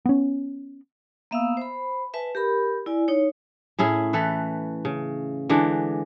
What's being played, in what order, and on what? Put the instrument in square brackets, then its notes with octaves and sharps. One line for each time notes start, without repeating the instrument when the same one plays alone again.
[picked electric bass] B3 C#4
[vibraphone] A#3 B3 E5 F5 D#6 E6
C5 B5
B4 E5 G#5 A5
G4 A#4 B5
E4 D5 G#5
D#4 C#5
[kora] A2 C#4 E4 G#4
E3 A4 B4
C#3
D3 E3 G#3 D4